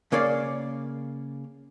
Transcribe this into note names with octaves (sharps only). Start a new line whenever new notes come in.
C#3 A#3 C#5 D5 F5